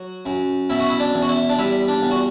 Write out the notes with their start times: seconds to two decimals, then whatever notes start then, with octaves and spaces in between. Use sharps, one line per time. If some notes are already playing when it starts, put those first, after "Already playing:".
Already playing: F#3 F#4
0.25 F#2
0.70 B2 E4
0.80 F#4
0.90 E4
1.00 D4
1.14 E2
1.22 F#4
1.28 E4
1.49 D4
1.58 G3 E4
1.88 D4
2.02 E2
2.11 F#4